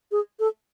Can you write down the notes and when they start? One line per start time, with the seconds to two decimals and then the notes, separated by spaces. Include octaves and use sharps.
0.12 G#4
0.39 A4